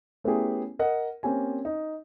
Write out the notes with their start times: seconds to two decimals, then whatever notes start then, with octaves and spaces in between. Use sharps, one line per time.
0.24 A3 B3 C#4 E4 G4 G#4
0.79 A#4 D#5 F#5
1.23 A#3 C4 C#4 G4 G#5
1.65 D#4